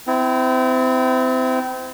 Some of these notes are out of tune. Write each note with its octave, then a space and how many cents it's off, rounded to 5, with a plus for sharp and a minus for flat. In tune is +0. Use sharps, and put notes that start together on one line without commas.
C4 -30 E4 +0